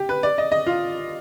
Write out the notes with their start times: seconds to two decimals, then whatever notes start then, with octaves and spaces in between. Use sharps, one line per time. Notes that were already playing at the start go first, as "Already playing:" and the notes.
Already playing: G4
0.09 B4
0.23 D5
0.38 D#5
0.52 D#5
0.67 F4